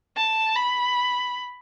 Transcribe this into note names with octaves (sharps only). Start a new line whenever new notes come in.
A5
B5